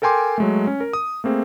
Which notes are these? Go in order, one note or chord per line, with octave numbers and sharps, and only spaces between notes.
A4 A#4 G5 G#5 C6 D6
F#3 G#3 A3
C#4
A#4
D#6
A3 A#3 C4 G#4